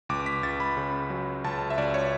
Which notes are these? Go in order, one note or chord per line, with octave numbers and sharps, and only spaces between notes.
C#2 D6
B6
C#2 A6
B5
C#3
F#3
C#2 A5
E5
C#2 D5
C#5